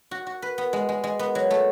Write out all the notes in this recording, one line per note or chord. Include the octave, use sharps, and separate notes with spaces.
F#4
F#4
B4
B3
G#3
G#3
G#3
B3
F#3
A3